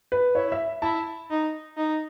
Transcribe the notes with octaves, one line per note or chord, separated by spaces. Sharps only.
B4
E4 C#5
E5
E4 A5
D#4
D#4